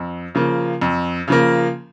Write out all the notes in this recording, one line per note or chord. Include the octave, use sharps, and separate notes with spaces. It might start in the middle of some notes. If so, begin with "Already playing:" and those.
Already playing: F2
C#3 F3 A#3
F2
C#3 F3 A#3